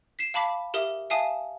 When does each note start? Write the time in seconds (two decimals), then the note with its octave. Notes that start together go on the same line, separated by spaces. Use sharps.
0.19 B6 C7 E7
0.34 F5 A5 B5 D6 B6
0.74 G4 A#4 E5 D#6
1.10 E5 F5 G#5 A5 D#6